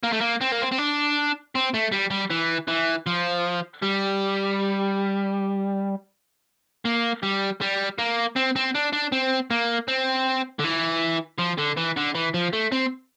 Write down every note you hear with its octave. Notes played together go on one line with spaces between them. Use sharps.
A#3
A3
A#3
C4
A#3
C4
C4
D4
C4
A3
G3
G3
E3
E3
F3
G3
A#3
G3
G3
A#3
C4
C4
D4
D4
C4
A#3
C4
D3
E3
F3
D3
E3
D3
E3
F3
A3
C4